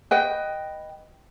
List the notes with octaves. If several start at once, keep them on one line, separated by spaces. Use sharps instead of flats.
B4 D#5 G5